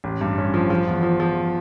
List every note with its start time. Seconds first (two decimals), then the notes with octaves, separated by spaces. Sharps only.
0.04 A1
0.21 G2
0.38 C#4
0.54 F3
0.70 F3
0.87 E2
1.03 F3
1.20 F3